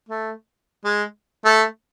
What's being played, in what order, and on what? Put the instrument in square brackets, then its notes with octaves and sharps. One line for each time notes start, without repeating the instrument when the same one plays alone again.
[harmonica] A3
G#3
A3